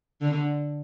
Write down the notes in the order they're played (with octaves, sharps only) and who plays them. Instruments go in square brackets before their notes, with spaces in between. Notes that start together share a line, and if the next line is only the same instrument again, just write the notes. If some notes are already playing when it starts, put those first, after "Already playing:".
[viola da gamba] D3